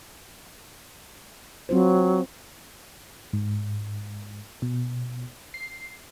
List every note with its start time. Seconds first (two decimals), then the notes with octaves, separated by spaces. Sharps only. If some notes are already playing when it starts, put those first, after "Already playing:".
1.69 F#3 C4 F4 C5
3.33 G#2
4.62 B2
5.54 C7